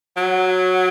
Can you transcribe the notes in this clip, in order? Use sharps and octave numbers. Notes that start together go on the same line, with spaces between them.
F#3